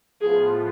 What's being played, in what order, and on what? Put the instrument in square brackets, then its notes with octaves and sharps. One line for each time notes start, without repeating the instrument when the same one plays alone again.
[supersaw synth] A2 F3 B3 F4 [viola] G#4